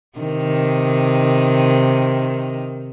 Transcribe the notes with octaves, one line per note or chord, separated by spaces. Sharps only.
C3 D#3